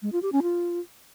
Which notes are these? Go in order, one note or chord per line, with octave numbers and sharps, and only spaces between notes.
G#3
F4
G4
C#4
F4